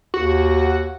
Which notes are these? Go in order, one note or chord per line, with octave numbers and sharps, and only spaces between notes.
D#2 F#4